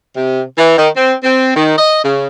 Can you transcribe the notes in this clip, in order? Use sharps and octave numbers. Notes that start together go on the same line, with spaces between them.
C3
E3
D#3
C4
C4
D#3
D#5
C#3